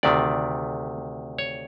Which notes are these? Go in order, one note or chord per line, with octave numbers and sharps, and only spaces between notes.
D2 C3 D#3 D5
C#5